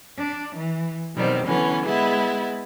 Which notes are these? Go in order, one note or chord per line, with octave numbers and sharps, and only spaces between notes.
D4
E3
B2 D#3 F#3 G3 C4
D3 E3 F#3 B3 C#4
G#3 B3 E4 G#4